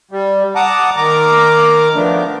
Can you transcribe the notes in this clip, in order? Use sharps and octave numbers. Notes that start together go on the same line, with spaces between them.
G3
F#5 A5 A#5 D6 D#6
D#3 A#4 A#5 D6
F3 A3 B3 D4